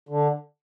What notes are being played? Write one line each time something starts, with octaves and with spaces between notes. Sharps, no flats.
D3